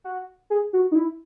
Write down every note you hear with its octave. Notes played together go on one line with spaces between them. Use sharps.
F#4
G#4
F#4
D#4
E4